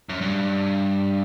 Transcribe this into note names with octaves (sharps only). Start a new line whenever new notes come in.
F#2
G2